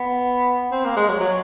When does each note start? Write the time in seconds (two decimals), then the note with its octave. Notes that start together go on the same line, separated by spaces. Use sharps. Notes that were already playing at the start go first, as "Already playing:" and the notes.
Already playing: B3
0.72 C4
0.84 A#3
0.97 G#3
1.09 F#3
1.20 F#3